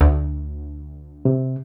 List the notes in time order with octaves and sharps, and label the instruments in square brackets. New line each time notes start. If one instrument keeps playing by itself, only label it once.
[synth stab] D2
[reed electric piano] C3